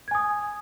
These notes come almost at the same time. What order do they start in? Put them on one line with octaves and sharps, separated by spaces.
G#6 G#5 D#6